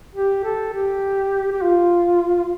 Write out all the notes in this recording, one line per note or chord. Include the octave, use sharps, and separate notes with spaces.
G4
A4
G4
G4
F4